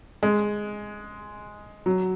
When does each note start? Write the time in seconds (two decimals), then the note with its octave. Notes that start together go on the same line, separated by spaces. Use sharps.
0.23 G#3
1.86 F#3